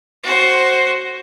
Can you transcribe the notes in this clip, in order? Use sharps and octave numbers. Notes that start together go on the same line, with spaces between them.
F#4 C5